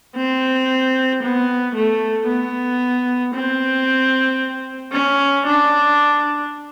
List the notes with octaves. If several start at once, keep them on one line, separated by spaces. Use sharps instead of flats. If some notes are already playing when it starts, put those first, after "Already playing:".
C4
B3
A3
B3
C4
C#4
D4